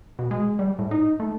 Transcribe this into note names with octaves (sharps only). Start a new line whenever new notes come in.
B2
G#3
G3
A2
D#4
A3